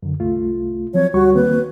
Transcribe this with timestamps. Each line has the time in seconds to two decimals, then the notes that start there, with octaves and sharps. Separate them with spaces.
0.03 F#2 D3
0.20 C2 A3 F4
0.94 F3 F#3 C4 C#5
1.14 D2 G3 F#4 C#6
1.35 D#3 A#3 C4 B4